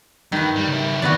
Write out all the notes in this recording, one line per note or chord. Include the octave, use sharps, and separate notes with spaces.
G2 D#3 B4
G3
C#3 E4
E2 D#3 F#4 B4 D5